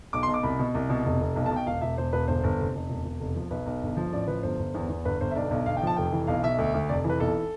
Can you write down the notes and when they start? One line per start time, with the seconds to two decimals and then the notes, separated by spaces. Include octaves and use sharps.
0.13 B1 D6
0.23 C6
0.28 B2
0.34 D6
0.43 C2 B5
0.59 B2
0.74 C2
0.89 B2
1.05 F1
1.21 F1
1.36 B1
1.46 A5
1.51 B2
1.56 G5
1.66 E1 F5
1.81 E1 E5
1.98 E1 C5
2.12 E1 B4
2.28 G1 C5
2.43 G1
2.59 F1
2.75 F1
2.89 E1
3.05 E1
3.20 F1
3.36 F3
3.51 B1 B4
3.66 B1
3.82 G1
3.97 F3
4.13 A1 D5
4.28 F3 B4
4.43 G1 C5
4.59 G1
4.74 E2
4.89 E2
5.05 G1 B4
5.21 G1 C5
5.31 E5
5.35 B1 D5
5.51 B1
5.66 G1 F5
5.77 G5
5.82 F3 A5
5.96 F1 G5
6.12 E3
6.27 B1 F5
6.43 B2 E5
6.58 D2
6.74 D2
6.89 F1 D5
7.04 E3
7.10 B4
7.19 B1 A4